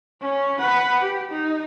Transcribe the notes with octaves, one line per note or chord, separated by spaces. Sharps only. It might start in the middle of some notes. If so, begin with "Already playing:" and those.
C#4
B4 F#5
G4
D#4